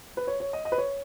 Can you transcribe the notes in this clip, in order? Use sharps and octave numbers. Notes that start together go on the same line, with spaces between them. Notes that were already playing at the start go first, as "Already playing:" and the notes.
B4
C#5
C#5
D#5
D#5
B4
C#5